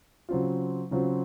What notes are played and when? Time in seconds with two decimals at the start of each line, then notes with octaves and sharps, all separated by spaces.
0.29 C#3 F#3 C4 F4
0.91 C#3 F#3 C4 F4